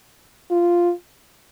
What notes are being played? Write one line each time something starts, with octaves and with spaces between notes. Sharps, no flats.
F4